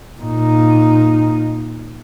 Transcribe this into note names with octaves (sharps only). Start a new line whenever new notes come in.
A#2 D#4